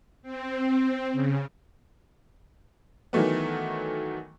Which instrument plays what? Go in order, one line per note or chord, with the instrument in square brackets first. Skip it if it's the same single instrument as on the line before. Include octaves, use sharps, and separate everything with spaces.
[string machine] C4
C#3
[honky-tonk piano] D#3 E3 F#3 A3 B3